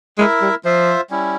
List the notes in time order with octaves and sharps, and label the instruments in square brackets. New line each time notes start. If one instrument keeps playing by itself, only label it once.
[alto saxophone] G#3 [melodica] E4 A#4 E5
[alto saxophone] G3
[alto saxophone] F3 [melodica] F4 C5 E5
[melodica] G3 C#4 E4